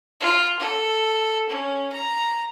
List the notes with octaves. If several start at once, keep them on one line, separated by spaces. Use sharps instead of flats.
F4
A4
C#4
A#5